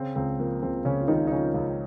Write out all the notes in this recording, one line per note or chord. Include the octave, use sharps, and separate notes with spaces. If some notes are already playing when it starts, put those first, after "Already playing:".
Already playing: C#3 C4
C#2 C4
F3 A#3
C#2 C4
C#3 C#4
F4
C#2 D#3 D#4
D#4
C#3 F3 C#4
C#2